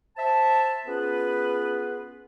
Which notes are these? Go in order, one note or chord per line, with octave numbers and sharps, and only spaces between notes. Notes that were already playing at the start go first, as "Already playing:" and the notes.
C5 E5 A5
B3 C#4 F4 G#4 B4